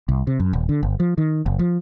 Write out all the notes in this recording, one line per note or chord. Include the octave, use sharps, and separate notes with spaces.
C2
C3
F#2
D#1
D3
G1
F3
D#3
F#1
F3